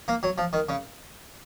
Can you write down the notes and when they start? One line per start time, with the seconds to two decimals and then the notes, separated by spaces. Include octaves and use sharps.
0.08 A#3
0.23 F#3
0.38 F3
0.53 D#3
0.69 C#3